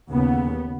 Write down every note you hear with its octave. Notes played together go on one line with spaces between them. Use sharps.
D#2 C#3 B3